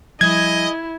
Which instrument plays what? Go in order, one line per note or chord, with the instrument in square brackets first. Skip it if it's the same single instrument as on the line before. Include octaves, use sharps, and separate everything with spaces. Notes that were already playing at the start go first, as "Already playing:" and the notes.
[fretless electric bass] F3 G3 [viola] E4 [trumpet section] G#4 D#5 [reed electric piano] G#6